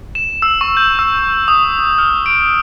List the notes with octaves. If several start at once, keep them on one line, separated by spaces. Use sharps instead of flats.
E7
E6
C#6
G6
E6
D#6
F6
D7